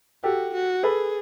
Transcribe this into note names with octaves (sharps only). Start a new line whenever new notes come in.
F#4 G4 A4
F#4
G#4 A4 B4